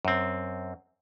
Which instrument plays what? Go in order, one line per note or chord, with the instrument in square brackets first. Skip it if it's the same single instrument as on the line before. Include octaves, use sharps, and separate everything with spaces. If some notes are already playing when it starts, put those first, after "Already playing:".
[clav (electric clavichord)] F#2 C4